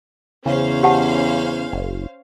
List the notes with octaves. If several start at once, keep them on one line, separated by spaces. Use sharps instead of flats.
E2 C#3 C#4 C5 F5
G4 F#5 A5
F#1